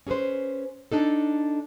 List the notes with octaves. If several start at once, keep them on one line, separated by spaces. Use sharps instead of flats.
C#4 G#4 A4 B4 C5
D4 D#4 A4